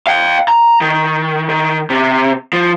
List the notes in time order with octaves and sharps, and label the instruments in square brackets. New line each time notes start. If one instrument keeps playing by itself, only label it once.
[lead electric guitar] F5 G5
A#5
D#3
D#3
C3
F3